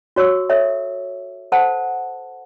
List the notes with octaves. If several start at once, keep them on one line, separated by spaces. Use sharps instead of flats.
F#4 C#5 C#6 E6
A4 C#5 E5
A4 C5 F#5 A5